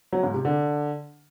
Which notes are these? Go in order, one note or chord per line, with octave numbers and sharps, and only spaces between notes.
F#3
G#2
C3
D3